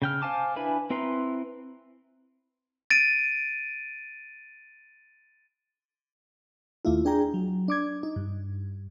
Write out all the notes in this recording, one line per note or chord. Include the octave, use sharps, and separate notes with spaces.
C#3 G5 F6
C5 F5 G#5 A5 D6
D4 E4 B4 G#5 B5
C4 E4 B4 A#5 C6
A6 D7 D#7
D#2 A3 E4 F4
D4 G#4 G5 A#5
F#3
D4 D6 G#6
D#4
G2